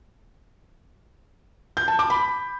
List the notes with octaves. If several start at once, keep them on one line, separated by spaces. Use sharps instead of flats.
G6
A5
D6
B5